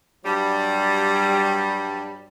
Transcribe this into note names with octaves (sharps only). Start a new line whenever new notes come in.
G2 F#3 G3